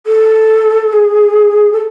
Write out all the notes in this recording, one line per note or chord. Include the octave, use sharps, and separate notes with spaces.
A4
G#4
A4